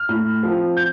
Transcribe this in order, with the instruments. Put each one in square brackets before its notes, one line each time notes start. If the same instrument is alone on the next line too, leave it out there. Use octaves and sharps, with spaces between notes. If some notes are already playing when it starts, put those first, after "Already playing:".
Already playing: [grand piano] F6
A2
F3 C4
G6